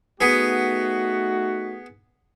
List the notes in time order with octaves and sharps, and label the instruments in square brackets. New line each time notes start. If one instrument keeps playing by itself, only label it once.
[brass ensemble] A3 D#4 F#4 [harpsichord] B3 G#4